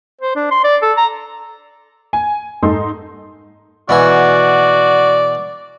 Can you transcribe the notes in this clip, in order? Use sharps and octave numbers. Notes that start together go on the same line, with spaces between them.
C5
D4
C6
D5
A4
A#5
G#5
G#2 D#4 A4 C6
B2 E3 F#4 D5 G#5